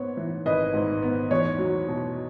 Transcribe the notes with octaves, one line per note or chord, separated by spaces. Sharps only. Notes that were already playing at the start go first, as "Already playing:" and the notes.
Already playing: G#2 B3 C#5
E3
G#1 B4 D#5
G#2
B3
E2 C#5
F#3
B2